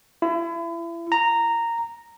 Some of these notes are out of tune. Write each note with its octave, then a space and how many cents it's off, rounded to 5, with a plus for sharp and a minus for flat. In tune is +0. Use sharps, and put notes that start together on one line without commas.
E4 +35
A#5 -10